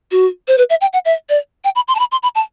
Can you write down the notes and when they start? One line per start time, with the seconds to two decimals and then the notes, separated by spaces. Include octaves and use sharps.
0.11 F#4
0.48 C5
0.58 B4
0.70 E5
0.81 G5
0.93 F#5
1.05 E5
1.29 D5
1.64 G5
1.76 B5
1.88 C6
1.95 A5
1.99 B5
2.12 C6
2.23 B5
2.35 A5